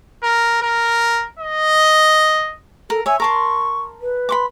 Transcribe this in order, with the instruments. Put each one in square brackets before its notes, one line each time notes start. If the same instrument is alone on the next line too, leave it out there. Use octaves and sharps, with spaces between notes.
[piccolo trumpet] A#4
A#4
D#5
[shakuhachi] A4 [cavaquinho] A#4
[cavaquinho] C#5 E5 [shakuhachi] G#5
[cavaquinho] A#4 A5 C6 [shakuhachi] C#6
[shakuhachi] B4
[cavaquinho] B5 C6 D6